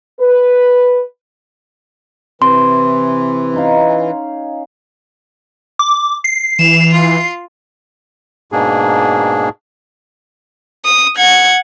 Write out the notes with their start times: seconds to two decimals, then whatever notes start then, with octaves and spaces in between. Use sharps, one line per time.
0.20 B4
2.42 C3 E3 C6
3.54 C#4 D#4 F5
5.79 D6
6.24 C7
6.59 E3 E7 F7
6.94 F4
8.52 G#2 B2 A#3 D4 G#4
10.85 D#6
11.17 F#5 G#6